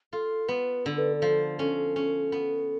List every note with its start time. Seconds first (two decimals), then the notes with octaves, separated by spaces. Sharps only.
0.13 F4 A4
0.49 B3 B4
0.86 D3 A4
0.98 B4
1.10 B4
1.13 A4
1.22 F3
1.59 C#4
1.96 C#4
2.32 B3